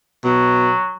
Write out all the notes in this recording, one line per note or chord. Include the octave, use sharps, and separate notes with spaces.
B2 F#3